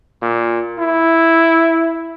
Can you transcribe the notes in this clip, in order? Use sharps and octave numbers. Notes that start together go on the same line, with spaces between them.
A#2
E4